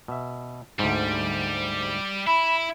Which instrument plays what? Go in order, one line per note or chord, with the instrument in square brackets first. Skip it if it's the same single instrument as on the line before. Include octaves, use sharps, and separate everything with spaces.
[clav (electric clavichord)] B2 E5
[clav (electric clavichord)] D2 G#2 [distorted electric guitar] G3
[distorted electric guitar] E4 [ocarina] B5